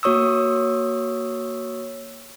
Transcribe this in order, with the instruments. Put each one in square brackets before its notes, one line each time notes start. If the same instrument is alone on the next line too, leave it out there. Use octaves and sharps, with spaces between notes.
[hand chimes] A#3 F#4 C#5 C#6 D#6 E6